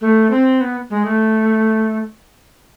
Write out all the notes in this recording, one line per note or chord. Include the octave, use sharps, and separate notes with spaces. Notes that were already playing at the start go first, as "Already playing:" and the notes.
A3
C4
B3
G#3
A3